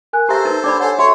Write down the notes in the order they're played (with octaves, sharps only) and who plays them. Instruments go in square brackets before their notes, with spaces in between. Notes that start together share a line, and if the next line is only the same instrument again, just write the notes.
[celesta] A#4 G#5 F#6
[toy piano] G4 E5 [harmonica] A4 C5 [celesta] A#5
[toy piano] D#4 A#4 [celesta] B4
[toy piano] D4 D5 B5 [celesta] D6
[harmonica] A4 C5 [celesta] C#5 G#5 [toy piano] F#5
[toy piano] F#4 [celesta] A4 E5 [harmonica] C#5